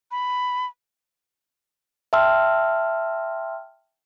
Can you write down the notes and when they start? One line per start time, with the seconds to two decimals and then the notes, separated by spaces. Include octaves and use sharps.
0.11 B5
2.13 E5 G5 A5 C6 E6 F6